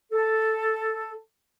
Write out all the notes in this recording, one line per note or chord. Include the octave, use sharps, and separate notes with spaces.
A4